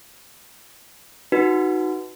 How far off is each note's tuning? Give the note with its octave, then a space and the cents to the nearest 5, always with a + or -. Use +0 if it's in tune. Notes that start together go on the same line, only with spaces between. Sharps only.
D#4 +10 F#4 +0 B4 +0